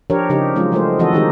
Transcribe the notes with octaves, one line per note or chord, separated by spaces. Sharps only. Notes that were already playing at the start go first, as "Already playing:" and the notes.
F3 D4 G4 A#4 C#5
C#3 F3 D#4 G4
F3 F#3 G#3 C#4 F4
F3 G#3 A3 F4 A#4 C5
E3 F3 C4 F#4 A4 D#5
D#3 G#3 D#4 G4 G#4